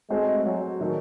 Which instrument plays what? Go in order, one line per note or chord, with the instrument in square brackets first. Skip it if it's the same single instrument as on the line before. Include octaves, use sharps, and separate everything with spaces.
[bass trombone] G#3 [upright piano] A3 C4 F#4 C5
[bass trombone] F#3
[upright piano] D#3 F#3 A3 D#4